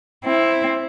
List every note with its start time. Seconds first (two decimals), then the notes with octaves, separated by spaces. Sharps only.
0.24 C4 E4